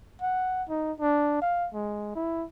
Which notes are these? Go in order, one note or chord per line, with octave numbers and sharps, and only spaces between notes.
F#5
D#4
D4
F5
G#3
E4